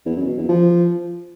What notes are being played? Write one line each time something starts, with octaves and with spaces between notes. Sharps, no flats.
E2
F#2
B2
E2
F3